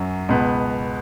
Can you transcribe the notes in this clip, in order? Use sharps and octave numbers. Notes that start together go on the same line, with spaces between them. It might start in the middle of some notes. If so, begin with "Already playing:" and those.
Already playing: F#2 F#3 C#4
C#2 B2 B3